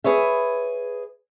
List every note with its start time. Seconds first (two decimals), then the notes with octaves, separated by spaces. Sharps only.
0.04 G#4 B4 C#5 E5